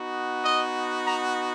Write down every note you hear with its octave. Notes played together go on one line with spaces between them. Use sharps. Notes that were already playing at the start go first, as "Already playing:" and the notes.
Already playing: B3 D#4 F#4
D#5
A#5